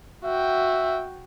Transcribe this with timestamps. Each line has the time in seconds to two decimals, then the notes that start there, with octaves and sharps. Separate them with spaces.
0.24 F#4 E5 G5